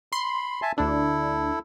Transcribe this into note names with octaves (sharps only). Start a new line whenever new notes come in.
B5 C6
E5 G#5 A5
D2 D4 E4 A4